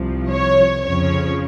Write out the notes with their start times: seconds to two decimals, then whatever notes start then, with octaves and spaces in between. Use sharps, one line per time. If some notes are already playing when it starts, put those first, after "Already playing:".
Already playing: C2 C3 F3
0.30 C#5
0.82 F2 C#3 F3 C#5